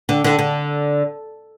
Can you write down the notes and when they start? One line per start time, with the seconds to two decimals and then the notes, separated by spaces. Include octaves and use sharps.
0.09 D3
0.24 D3
0.39 D3